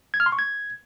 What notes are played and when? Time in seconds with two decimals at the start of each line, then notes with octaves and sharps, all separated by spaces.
0.14 G#6
0.20 F6
0.26 C6
0.32 C#6
0.39 G#6